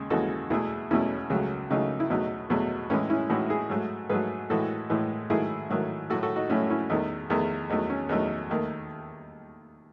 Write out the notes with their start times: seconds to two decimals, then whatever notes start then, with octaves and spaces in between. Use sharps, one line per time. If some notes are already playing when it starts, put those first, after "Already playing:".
Already playing: D#2 C#3 G#3
0.10 D#2 C#3 E3 G#3 F#4 A4
0.50 E2 B2 A3 E4 G#4
0.90 E2 B2 A3 C#4 E4
1.30 C#2 C#3 F#3 A3
1.71 C#2 C#3 F#3 A3 D#4
2.00 E4
2.10 E2 B2 F#3 A3 D#4
2.50 E2 B2 F#3 A3
2.90 A2 E3 G#3 C#4 E4
3.10 C#4 E4
3.30 A2 E3 G#3 D#4 F#4
3.50 E4 G#4
3.70 G#2 F#3 A3
4.09 G#2 F#3 A3 G#4 B4
4.50 A2 E3 G#3 F#4 A4
4.90 A2 E3 G#3
5.30 G#2 D#3 F#3 A3 E4 G#4
5.70 G#2 D#3 F#3 A3
6.10 A2 F#3 A3 F#4 A4
6.23 F#4 A4
6.36 D#4 F#4
6.50 A2 F#3 A3 C#4 E4
6.70 C#4 E4
6.90 E2 D#3 A3 D#4
7.30 E2 D#3 A3
7.70 E2 D#3 F#3 A3 D#4
7.90 C#4
8.09 E2 D#3 F#3 A3 D#4
8.49 D#2 D#3 A3